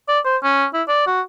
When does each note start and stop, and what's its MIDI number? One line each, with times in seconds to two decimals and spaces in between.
0.08 0.19 74
0.25 0.36 72
0.43 0.65 61
0.73 0.82 64
0.88 1.06 74
1.06 1.21 66